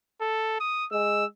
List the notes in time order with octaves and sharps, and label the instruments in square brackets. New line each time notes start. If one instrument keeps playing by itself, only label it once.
[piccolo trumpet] A4
D#6
[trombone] G#3 [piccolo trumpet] E6